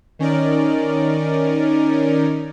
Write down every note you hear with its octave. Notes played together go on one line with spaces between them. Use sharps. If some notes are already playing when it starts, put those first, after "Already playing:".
D#3 C#4 D#4 A#4 D5